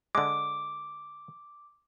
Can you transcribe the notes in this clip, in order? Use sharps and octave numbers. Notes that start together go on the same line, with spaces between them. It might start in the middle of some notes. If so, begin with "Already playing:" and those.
D3 G#3 D6